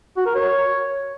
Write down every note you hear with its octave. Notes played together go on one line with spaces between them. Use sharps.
F#4
A#4
C#5